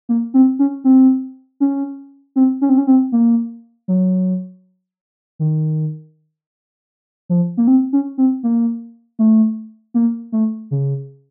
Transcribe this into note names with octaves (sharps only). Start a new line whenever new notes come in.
A#3
C4
C#4
C4
C#4
C4
C#4
C4
C#4
C4
A#3
F#3
D#3
F3
A#3
C4
C#4
C4
A#3
A3
A#3
A3
C#3